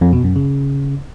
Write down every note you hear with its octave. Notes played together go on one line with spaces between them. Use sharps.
F2
B2
F#2
C#3